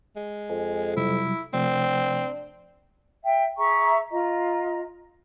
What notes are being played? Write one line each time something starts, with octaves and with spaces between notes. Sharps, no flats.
G#3
F2 G#5
C3 F#3 G3 E4
C3 F3 A3 C4 D4
E5 G5
G#4 E5 A#5 C#6
F4 D#5 A#5